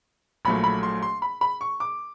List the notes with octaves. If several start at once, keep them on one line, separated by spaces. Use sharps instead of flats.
A#1 A#2 F#3 A3 B5
B5
C6
C6
B5
B5
C#6
D6